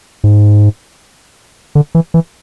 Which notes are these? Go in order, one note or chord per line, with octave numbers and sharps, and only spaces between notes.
G#2
D3
E3
E3